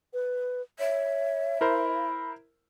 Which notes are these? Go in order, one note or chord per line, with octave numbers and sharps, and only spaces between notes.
B4
C#5 E5
E4 A#4 C5 B5